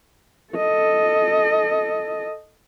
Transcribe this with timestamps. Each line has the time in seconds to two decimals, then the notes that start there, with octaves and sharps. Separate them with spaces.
0.53 A4 D#5